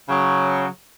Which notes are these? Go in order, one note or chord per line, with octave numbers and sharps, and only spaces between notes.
C#3 F#3